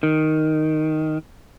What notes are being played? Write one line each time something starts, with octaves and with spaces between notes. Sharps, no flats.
D#3